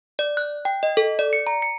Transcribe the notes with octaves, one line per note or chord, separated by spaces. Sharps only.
D5
F#6
G5
D#5
A4
D5
C#7
A#5
C#7